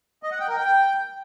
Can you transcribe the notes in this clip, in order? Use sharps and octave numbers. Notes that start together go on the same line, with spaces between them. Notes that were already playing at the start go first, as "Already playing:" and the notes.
D#5
F#5
G5
A#4
G5